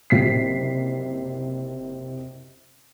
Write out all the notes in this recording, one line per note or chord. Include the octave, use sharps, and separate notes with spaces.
F#1 C3 B6 C7